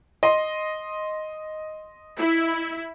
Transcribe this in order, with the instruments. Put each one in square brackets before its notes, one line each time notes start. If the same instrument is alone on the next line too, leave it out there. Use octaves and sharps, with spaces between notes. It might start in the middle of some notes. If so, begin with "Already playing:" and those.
[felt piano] D#5 C6
[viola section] E4